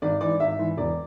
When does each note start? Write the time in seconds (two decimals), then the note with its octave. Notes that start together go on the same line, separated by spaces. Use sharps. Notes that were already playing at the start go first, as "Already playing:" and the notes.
0.02 G#1 D5
0.21 G#2 E3 D5
0.40 G#1 E5
0.59 G#2 E3
0.77 E1 D5